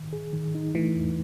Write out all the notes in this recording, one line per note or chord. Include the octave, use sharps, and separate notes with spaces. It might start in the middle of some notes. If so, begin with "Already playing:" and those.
Already playing: D#3
G#4
D#3
D#4
E3 A3
E2